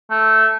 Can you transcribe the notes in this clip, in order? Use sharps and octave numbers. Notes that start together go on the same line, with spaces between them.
A3